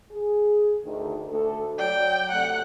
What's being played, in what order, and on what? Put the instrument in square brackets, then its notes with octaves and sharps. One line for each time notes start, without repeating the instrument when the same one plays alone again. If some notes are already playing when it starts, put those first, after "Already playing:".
[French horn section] G#4
D2 D#3
D2 A3 A4
[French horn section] F#3 D5 [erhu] G5
[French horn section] C3 F#3 A3 [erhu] F#5